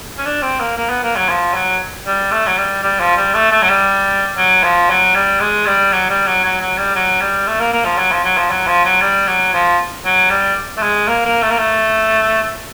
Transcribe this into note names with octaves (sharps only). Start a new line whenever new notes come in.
C#4
D4
C4
A#3
A#3
B3
A#3
F#3
F3
F#3
G3
A3
F#3
G3
G3
F3
G3
A3
A3
F#3
G3
F#3
F3
F#3
G3
G#3
G3
F#3
G3
F#3
F#3
F#3
G3
F#3
G3
A3
A#3
A#3
F3
F#3
F3
F#3
F3
F#3
F3
F#3
G3
F#3
F3
F#3
G3
A3
G#3
A#3
A#3
A3
A#3
A3